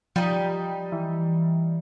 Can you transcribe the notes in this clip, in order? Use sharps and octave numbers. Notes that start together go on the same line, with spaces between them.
F3 G3 D#4
E3